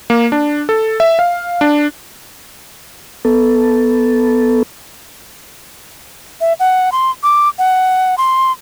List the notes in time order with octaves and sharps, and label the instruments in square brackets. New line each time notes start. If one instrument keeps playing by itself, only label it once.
[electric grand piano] A#3
D4
A4
E5
F5
D4
[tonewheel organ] B3 A4
[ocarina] E5
F#5
C6
D6
F#5
C6